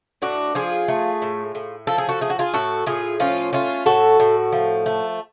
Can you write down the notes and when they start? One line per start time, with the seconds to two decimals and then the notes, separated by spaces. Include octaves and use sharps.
0.22 A2 D4 F#4
0.55 F3 F4 G#4
0.88 A3
1.22 A2
1.55 A2
1.87 F3 A4
1.98 G#4
2.09 F#4 A4
2.21 A3 G#4
2.30 F#4
2.39 F4 G#4
2.54 A2 F#4 A4
2.86 A2 F4 G#4
3.20 F3 C#4 F4
3.53 A3 C#4 F4
3.86 A2 F#4 A4
4.20 A2
4.53 F3
4.86 A3